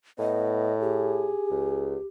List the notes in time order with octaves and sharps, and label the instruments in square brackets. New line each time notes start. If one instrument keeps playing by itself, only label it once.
[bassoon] A2 [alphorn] B3 [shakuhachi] D#5
[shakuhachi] G4 [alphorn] G#4
[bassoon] C#2